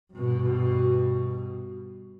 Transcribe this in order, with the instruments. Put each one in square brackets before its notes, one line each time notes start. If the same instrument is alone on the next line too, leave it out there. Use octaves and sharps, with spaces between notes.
[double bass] G2 B2